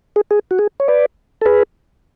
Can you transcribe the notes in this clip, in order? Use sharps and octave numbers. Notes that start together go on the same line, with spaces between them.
G#4
G#4
F#4
G#4
C#5
B4 D5
A4
G#4 B4